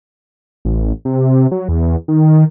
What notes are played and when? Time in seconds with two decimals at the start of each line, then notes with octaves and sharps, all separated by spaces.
0.65 A1
1.05 C3
1.51 F#3
1.68 E2
2.08 D#3